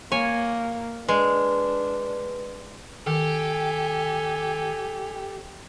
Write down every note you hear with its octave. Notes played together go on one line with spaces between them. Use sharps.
A#3 C#5 G#5
G#3 D4 B4
D#3 G4 A4 G#5